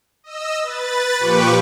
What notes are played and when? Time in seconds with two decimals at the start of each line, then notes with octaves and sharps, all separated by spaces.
0.24 D#5 E6
0.62 B4 A6
1.19 A#2 F3 G4 B4 C#6 D6